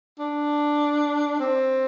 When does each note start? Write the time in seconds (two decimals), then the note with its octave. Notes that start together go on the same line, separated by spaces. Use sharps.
0.19 D4
1.40 C4